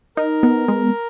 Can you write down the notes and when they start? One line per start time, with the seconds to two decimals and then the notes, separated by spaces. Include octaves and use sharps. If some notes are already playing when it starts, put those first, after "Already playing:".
0.17 D#4 A#4
0.43 B3
0.68 G#3